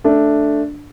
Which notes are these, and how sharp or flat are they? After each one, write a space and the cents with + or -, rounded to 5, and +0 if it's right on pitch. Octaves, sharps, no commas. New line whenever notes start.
A3 +0 D4 +0